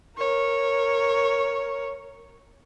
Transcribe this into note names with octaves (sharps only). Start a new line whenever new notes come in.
A#4 C#5